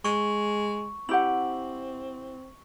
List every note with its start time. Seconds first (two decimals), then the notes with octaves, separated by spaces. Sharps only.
0.05 G#3 C#6
1.09 C4 E4 G4 F#5 F#7